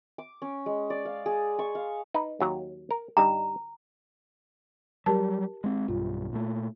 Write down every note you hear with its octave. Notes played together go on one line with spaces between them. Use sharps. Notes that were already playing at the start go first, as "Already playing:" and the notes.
D6
C#4
G#3
D5
F5
G#4
C#6
F5
D#4 B4
D#2 F#3 A#5
A#4
G2 G3 D#4 A#5
F#3 G3 G4 A#4 A5
G#3 C4
B1 G2 F4
A#2 A3